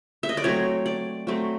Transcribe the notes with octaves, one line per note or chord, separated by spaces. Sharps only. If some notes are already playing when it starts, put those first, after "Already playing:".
E5
D#5
D5
F#3 A3 C4 C#5
D5
F#3 A3 C4